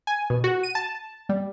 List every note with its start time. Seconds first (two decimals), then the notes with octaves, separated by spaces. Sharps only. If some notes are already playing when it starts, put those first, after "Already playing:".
0.07 G#5
0.30 B2
0.44 F#4
0.63 D#7
0.75 A5
1.29 G3